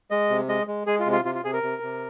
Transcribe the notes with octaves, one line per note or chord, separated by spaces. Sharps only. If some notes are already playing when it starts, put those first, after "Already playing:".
G#3 D#5
C3
G#3 D#5
G#3
G#3 G#4
F4
C3
F4
C3 F4
F4
C3 G#4
A#4
C3
C3